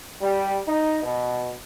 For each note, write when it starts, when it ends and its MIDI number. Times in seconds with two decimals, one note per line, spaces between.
0.22 0.58 55
0.68 1.03 63
1.03 1.52 47